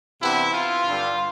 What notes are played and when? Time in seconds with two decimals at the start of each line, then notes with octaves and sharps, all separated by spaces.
0.22 C3 E3 B3 D4 E4
0.54 F4
0.86 G2 D3 G3